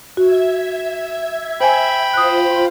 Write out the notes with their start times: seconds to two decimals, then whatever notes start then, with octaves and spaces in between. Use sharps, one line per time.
0.17 F#4 E5 G#6
1.61 C5 G5 G#5 B5
2.14 F4 C5 D#6 F#6